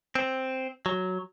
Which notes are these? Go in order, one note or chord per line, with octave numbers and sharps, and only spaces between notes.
C4
F#3